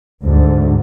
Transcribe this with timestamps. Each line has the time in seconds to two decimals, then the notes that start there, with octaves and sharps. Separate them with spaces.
0.24 D2 G#2